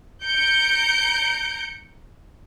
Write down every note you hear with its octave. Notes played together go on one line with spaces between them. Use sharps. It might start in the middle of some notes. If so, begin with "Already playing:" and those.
A#5 G6 C#7 D7